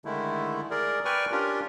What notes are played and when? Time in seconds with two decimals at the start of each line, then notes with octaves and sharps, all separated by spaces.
0.05 D3 D#3 G#3 A3 E4
0.71 G#4 A#4 D5
1.05 B4 D5 G5 G#5 C#6 F6
1.32 C#4 D4 F4 G4 A#4